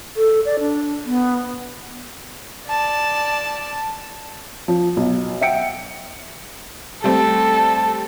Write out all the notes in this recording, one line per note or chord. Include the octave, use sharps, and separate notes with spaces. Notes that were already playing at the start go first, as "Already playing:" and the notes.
A4
D5
D4
B3
D5 A5
F3
B1
E5 F#5 G5 C#7 D7
G3 A3 C4 A4